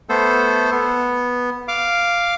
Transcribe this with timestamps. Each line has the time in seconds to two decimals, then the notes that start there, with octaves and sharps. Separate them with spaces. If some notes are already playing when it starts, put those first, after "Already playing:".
0.09 A3 B3 A4 C5
0.72 B3
1.68 F5 D6